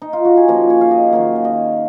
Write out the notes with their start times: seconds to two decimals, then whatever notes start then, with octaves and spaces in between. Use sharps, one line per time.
0.02 D#4
0.13 F4
0.25 F#4
0.37 G#4
0.48 F3 A#3 C#4 A#4
0.70 C#5
0.81 F5
0.91 D#5
1.12 D#3 F#3 A#3 F5
1.35 F5
1.45 D#5